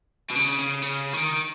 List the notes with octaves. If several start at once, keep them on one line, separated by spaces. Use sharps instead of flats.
B2
C#3
C#3
C#3
D#3